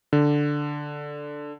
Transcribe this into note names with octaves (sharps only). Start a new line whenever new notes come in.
D3